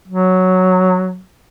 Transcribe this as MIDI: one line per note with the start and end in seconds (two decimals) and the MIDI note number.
0.08 1.19 54